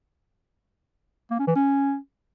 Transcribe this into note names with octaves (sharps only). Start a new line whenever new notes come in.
A#3
C#4
E3
C#4